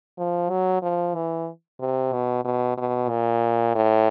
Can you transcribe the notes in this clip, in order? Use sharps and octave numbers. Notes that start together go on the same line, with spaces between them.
F3
F#3
F3
E3
C3
B2
B2
B2
A#2
A2